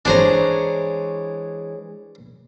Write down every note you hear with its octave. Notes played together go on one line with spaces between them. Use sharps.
E3 G#3 D4 C5 C#5 A#5